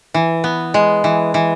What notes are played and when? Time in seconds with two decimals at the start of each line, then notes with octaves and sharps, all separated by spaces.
0.14 E3
0.44 B3
0.74 G#3
1.04 E3
1.34 E3